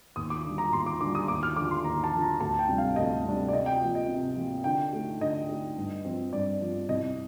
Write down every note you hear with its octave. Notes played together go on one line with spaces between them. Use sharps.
D#2 D#6
D6
D3 G3
A#5
D#2 C6
D6
D3 G3 D6
D#6
D#2 D6
F6
D3 F3 D6
C6
D#2 A#5
A5
D3 F3
A#5
D2 A5
G5
C3 G3 D4
F5
D2 D#5
C3 G3 D4
D5
C3 D#5
G5
F3 A#3 F4
D#5
C3
F3 A#3 F4
D3 G5
A3 D#4
D3 D#5
A3 D#4
G2
F3 C4
G2 D5
F3 C4
C2 D#5